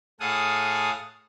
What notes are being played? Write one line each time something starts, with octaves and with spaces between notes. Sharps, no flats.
A2 G#4 A4 F5 F#5 D#6